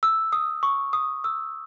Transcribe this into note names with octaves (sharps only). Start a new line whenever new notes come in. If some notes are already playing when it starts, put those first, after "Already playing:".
E6
D#6
C#6
D#6
E6